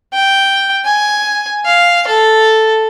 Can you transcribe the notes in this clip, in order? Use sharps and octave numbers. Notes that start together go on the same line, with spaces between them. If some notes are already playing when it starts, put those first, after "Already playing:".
G5
G#5
F5
A4